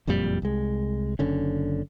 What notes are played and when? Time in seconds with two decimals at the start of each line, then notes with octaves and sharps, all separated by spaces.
0.07 F#1 F2 A#2 G3
0.42 C2 G#3
1.19 F#1 D3 C#4